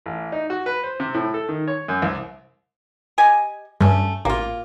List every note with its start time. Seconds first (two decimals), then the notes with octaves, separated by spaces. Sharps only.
0.06 A1
0.32 D#4
0.50 F#4
0.66 B4
0.83 C5
1.00 C3
1.14 A2
1.34 A4
1.49 D#3
1.68 C#5
1.88 F#2
2.02 C2
3.18 G4 D#5 G#5
3.81 G2 A3 C#4
4.25 A1 A#3 F4